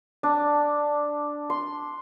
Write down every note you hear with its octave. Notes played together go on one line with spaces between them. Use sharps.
D4
C6